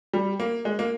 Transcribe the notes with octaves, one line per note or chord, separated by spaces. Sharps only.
G3
A#3
G#3
A#3